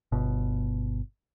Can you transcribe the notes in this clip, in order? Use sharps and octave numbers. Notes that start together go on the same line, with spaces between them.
G1 B2